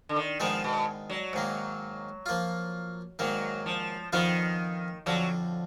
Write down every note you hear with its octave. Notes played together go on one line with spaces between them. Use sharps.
D3
D#3
G#2 D#3 F3 G#3 B3
B2
F#3
G#2 D#3 A#3
F3 A#3 F4
G#2 D#3 F#3 A#3
F3
F2 D#3 F3 B3 F4
F2 D3 F3 F#3